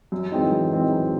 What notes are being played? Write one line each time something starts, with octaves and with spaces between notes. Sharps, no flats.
F#2
E3 G#3 C4 D#4
F#2
E3 G#3 C4 D#4
F#2